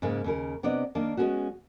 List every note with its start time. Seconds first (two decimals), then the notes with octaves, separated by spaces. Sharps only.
0.02 G#2 C#3 G#3 A#3
0.24 D#2 C#3 A#4
0.63 C3 B3 D4 D5 D#5
0.95 D#3 A#3 D4
1.17 G#3 A#3 B3 C#4 F#4